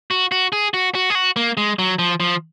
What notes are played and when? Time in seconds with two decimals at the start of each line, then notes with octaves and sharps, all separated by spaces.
0.11 F#4
0.32 F#4
0.53 G#4
0.74 F#4
0.95 F#4
1.10 G#4
1.15 F#4
1.36 A#3
1.57 G#3
1.79 F#3
1.99 F3
2.20 F3